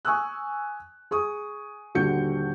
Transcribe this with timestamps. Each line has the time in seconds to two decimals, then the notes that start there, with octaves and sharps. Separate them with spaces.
0.05 G#5 C#6 D#6 E6 F#6
1.11 G#4 C#6 D#6
1.95 D#1 D3 F#4 G6 C#7